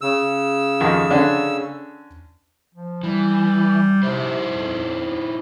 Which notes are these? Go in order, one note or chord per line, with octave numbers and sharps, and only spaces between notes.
C#3 E6
F2 D#3
D3 C#4 D4
F3
E3 G3
C3 D#4 E4 C5
F2